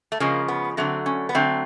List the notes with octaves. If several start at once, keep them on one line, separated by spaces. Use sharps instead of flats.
A3
C#3 F3 G#3 A#3
B3
D3 F#3 A3 C4
C#4
B3
D3 F#3 A3 C4